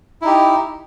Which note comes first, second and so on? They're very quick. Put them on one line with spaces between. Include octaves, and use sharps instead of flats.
E4 D#4 G4